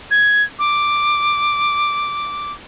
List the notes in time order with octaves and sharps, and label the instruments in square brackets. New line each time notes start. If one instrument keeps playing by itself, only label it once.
[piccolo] G#6
D6